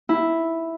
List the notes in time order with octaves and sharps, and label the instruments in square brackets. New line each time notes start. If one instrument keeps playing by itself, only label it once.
[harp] E4